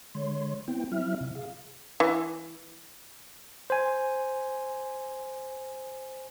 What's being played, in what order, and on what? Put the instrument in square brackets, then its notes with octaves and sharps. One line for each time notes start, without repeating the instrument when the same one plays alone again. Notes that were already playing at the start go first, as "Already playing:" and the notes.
[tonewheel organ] D3 G#3 C#5 C6
B3 C4 E4 G5
F#3 C4 E4 E5 F6
C3
G#4 F5
[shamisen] E3
[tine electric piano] C5 G#5